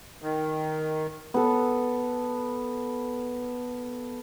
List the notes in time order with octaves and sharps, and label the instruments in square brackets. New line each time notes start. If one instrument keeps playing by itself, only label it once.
[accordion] D#3
[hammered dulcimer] B3 A4